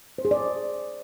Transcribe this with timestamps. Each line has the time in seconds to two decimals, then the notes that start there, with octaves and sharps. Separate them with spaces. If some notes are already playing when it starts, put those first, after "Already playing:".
0.18 C5
0.25 G#4
0.31 D5